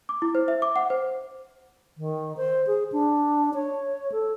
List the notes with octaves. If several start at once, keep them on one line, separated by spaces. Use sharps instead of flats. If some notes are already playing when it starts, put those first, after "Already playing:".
D6
E4
C5
E5
D6
F#5
C5
D#3
C5
G#4
D4
C#5
A4